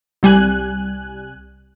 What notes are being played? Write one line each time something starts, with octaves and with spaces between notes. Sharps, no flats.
C2 G3 G#5 F#6